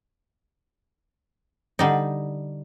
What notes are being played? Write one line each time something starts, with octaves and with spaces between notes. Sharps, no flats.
D3 G3 D#4